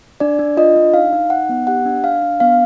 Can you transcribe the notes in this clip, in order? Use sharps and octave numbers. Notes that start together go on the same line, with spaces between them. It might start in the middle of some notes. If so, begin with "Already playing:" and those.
D4 D5
D4
F4 D#5
D4
D#4 F5
D#4
D#4 F#5
B3
G4 F#5
D4
D4 F5
D4
B3 F5